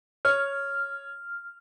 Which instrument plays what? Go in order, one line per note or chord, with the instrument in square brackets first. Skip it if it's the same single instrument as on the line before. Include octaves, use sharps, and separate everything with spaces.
[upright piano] C#5 [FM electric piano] F6